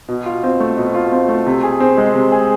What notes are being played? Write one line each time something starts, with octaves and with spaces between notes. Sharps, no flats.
B2
F4
C4
A3
B2
F4
C4
A3
C3
G#4
C4
G#3
C3
G#4